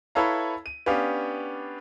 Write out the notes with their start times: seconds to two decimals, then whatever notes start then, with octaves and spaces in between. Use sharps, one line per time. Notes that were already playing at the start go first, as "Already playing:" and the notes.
0.15 E4 A4 B4 C#5 F5 A#5
0.66 D#7
0.86 B3 C#4 D4 G4 F5